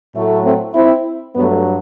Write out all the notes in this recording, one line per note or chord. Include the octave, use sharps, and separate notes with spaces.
A2 F#3 A3
A3 C4
C4 E4
G2 F#3 A3 B3